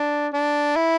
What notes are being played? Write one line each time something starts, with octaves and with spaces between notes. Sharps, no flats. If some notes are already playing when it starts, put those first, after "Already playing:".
Already playing: D4
D4
E4